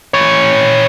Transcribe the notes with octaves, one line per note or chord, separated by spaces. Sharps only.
E3 C#5